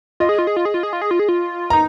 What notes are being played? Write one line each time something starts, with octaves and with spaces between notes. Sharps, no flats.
F4 D#5
G#4
F4
G#4
F4
G#4
F4
G#4
F4
G#4
F4
G#4
F4
D#4 A#5